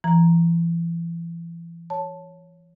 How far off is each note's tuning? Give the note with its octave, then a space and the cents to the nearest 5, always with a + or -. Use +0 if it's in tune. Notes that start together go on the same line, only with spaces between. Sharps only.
E3 +35 A#5 +0
C#5 +0 A5 +0